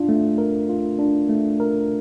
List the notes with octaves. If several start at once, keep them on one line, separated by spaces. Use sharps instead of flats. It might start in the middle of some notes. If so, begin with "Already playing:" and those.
Already playing: D4 F4
A3
A#4
F4
D4
A3
A#4